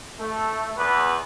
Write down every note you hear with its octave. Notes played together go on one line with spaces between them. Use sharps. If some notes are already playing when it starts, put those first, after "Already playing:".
A3
E2 B4